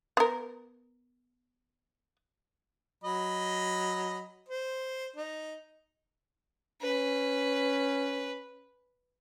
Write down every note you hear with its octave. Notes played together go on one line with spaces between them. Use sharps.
B3 A#4
F#3 D#5 B5
C5
D#4
C#4 B4